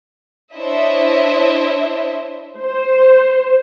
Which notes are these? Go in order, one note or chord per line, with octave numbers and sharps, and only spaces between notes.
D4 E4 C5 C#5 D#5 E5
C5